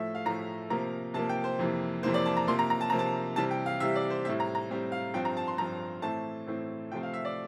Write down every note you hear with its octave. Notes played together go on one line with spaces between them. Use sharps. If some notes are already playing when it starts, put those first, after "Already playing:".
Already playing: A2 F3 A3 E5
F5
A2 F3 A3 A#5
C3 F3 A#3 A#5
C3 F3 A#3 A5
G5
C5
F2 C3 E3 A#3
F2 C3 E3 A#3 C5
D5
A5
A#5
C3 F3 A#3 C6
A#5
A#5
A5
C3 F3 A#3 A#5
A5
C3 E3 G3 A5
G5
F5
C3 E3 G3 E5
D5
C5
A2 G3 C4 E5
A#5
A#5
A2 G3 C4
F5
G2 F3 C4 G5
A#5
A5
C6
G2 F3 C4 A#5
A2 E3 A3 C4 A5
A2 E3 A3 C4
C3 F3 A3 C4 G5
F5
E5
D5